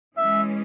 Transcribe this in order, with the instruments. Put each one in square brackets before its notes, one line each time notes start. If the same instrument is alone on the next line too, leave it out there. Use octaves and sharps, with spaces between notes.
[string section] E3 G#3 C#4 [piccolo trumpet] E5